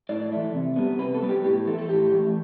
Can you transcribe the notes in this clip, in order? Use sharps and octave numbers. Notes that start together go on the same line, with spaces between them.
A2 D5
E3 A3
C3
G3 B3
C3 B4
A4
G3 B3
G4
A2 G4
E3 A3 A4
A4
A2 G4
E3 A3